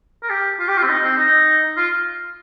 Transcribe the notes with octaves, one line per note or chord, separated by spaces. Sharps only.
A#4
G4
F4
G4
F4
C4
D#4
C4
D#4
F4